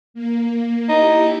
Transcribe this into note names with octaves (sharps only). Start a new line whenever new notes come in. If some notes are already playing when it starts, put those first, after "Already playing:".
A#3
D#4 E4 G4